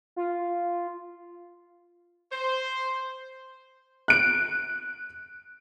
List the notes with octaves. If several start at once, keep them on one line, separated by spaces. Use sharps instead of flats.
F4
C5
F#6 D7